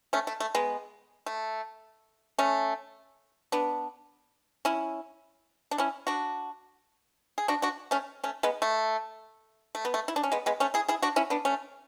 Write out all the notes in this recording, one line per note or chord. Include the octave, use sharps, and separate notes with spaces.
A3 C#4
A3
A3
G#3 B3
A3
A3 C#4
B3 D4
C#4 E4
D4
C#4 E4
D4 F#4
G#4
D4 F#4
D4 F#4
A3 C#4
A3 C#4
G#3 B3
A3
A3
B3
A3
E4
D4
C#4
G#3 B3
G#3 B3
A3 C#4
E4 G#4
E4 G#4
D4 F#4
C#4 E4
B3 D4
A3 C#4